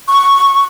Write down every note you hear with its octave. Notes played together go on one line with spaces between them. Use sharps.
C#6